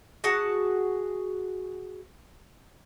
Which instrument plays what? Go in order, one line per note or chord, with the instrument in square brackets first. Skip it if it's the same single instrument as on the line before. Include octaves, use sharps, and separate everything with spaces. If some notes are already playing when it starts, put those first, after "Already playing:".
[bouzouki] F#4 G#4 F#5 A5